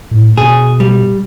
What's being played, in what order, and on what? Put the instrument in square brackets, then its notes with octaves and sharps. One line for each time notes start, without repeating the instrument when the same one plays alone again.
[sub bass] A2
[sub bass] B2 [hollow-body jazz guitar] G#4
[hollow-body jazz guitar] G3